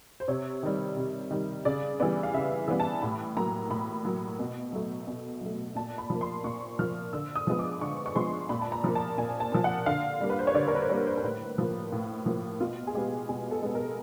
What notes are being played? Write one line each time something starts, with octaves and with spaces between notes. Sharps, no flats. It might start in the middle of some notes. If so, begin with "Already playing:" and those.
C5
C3 C#5
D#3 G3
C3
D#3 G3
C#3 D5
E3 G3 B3 D5
F5
C#3 E5
E3 G3 B3
A5
A2 B5
F#3 A#3 A#5
A2 B5
F#3 A#3
B2
F#3 A3
B2
F#3 A3
A#2 A5
B5
F3 A#3
C6
A#2 C#6
F3 A#3 F6
D3 E6
D#6
F3 G#3 B3
D6
D3 C#6
C#6
F3 G#3 B3 C6
A#2 B5
A5
A#5
F3 A#3
A5
A#2 G#5
A5
F3 A#3
F#5
D3 F5
G3 A#3
B4
C5
C#5
D3 D5
A#4
B4
C5
G3 A#3 C#5
C5
A#4
A2 B4
F3 A#3
A2
F3 A#3
B2 F4
G#4
G#3 B3 G4
B2 G#4
A4
G#3 B3
A#4